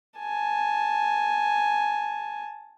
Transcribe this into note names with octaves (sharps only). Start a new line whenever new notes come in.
G#5 A5